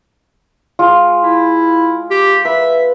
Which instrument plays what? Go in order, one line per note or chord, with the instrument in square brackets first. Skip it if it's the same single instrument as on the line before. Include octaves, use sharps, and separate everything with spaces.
[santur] G#3 F4
[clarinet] E4
G4
[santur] B4 [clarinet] E5